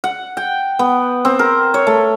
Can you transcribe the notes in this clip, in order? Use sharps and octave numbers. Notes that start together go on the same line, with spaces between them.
F#5
G5
B3
C4
A#4
C#5
A3